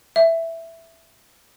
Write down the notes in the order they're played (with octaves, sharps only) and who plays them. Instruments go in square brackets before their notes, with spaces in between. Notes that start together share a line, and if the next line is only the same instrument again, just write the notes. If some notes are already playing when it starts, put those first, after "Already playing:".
[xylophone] E5